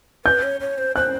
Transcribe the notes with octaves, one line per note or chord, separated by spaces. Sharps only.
B4 G6
C#5
C#5
C5
C5 F#6